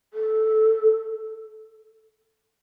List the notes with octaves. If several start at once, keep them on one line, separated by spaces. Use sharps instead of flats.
A4